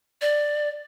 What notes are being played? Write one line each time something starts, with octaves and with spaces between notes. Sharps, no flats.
D5